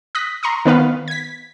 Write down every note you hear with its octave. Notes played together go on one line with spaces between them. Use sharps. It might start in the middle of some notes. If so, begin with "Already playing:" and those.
D#6 F#6 A#6 B6
A#5 C6 C#6 D#6
D#3 B3 B4 F5
G#6 B6